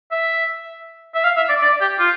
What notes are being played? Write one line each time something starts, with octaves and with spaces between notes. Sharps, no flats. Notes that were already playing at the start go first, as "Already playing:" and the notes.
E5
E5
F5
E5
D5
D5
G4
F4